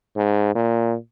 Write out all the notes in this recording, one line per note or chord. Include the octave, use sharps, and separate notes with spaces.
G#2
A#2